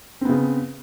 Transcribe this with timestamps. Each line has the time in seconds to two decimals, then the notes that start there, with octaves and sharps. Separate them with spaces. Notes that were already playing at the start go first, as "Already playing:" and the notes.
0.21 C4
0.25 B3
0.29 C#3